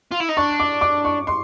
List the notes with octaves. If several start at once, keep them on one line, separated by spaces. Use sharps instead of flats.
F4
E4
D#4
D4 C#6
D6
D6
C#6
C6